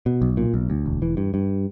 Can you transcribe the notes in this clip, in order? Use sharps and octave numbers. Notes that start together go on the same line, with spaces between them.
B2
B1
A#2
B1
D2
E1
E3
G2
G2